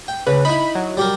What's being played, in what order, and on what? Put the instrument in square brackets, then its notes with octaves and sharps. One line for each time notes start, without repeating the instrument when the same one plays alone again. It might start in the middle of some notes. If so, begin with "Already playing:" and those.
[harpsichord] G5
[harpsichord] C#3 [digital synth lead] B4
[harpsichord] D#4 E4 [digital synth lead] B5
[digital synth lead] F#3
[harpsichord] G3 G4 A#4